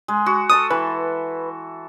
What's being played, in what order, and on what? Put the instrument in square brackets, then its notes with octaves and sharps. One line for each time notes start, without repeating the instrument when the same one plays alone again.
[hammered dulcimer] G#3
F#4
[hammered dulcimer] A4 A5 C6 [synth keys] D#6
[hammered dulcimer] E3 [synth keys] B4